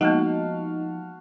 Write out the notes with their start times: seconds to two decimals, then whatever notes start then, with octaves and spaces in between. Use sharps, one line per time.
0.01 F3 G#3 A#3 B3 D#4 F#4 F5 A5